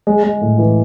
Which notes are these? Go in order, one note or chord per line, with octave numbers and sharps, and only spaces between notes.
G#3
G#3
A2
E3